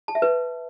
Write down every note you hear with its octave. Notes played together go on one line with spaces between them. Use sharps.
A5
E5
B4